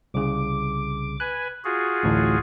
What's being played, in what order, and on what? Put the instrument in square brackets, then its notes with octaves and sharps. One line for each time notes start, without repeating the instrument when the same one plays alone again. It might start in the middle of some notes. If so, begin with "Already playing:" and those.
[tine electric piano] C2 C#3 [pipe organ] D6
[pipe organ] B4 G#5 [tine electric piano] F#6
[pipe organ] F4 F#4 G#4
[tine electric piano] A1 D2 A2